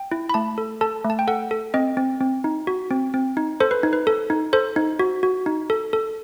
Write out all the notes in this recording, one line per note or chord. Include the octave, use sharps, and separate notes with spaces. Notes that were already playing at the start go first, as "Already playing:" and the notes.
Already playing: G5
E4
B5
A3 A5
A4
A4 A5
A3
A5
G5
A4 F#5
A4
C4 D#5
C4
C4
D#4
F#4
C4
C4
D#4
A4 C5
B4
D#4
B4
A4
D#4
A4 C5
D#4
F#4
F#4
D#4
A4
A4